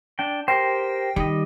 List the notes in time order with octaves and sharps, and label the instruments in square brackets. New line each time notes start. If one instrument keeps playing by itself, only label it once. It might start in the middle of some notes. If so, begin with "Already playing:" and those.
[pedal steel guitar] D4 G5
[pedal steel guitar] G4 A#4 C5 [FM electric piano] G5
[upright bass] D#3 [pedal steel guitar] G3 D#5